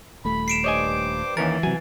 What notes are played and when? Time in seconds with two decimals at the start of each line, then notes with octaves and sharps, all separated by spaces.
0.25 D#1 A3 B5
0.48 C7 D7 E7
0.64 G2 C5 C#5 D#5 G#5 D6
1.37 D#2 E3 C#4 A#4 A6
1.63 C3 F#3 G#5